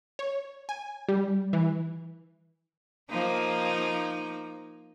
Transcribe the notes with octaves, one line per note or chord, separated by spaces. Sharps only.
C#5
G#5
G3
E3
F3 A#3 D#4